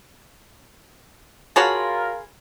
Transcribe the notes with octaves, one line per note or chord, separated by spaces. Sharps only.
F4 F#4 G#4 A#4 C#5 A5 B5